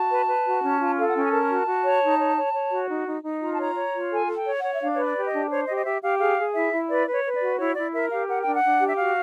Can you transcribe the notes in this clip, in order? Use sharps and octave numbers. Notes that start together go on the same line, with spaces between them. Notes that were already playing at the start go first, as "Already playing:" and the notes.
Already playing: F#4 A5
B4
B4
F#4
C#4
F4
A4 F5
F#5
C#4 G5
G#5
A#4 A5
F#4
F#4
C#5
D#4
C#5
C#5
C#5
F#4
D#4
D#4
D#4
F4 A#5
A5
C#5 A#5
C#5
F4
A4 G#5
A4
G5
C#5
F#5
C#5
E5
D4 F5
B4 C#5
D5
G4
D#5
D4
C5 C#5
G4 D#5
D#5
G4 E5
G4 F5
G#4 F5
G#4
E4 E5
E4
B4 D5
B4
C#5
B4
D5
F#4
E4 C#5
E4 D5
A#4 E5
G4 F5
A#4 F#5
G5
D4
F#5
D4
G4
E5
F#4 F5